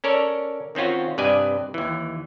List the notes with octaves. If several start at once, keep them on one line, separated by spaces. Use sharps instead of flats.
C#4 A4 A#4 C#5 D5
D#3 C4 C#4 F4 F#4
G2 C3 B4 D5 D#5 G#5
D#2 E3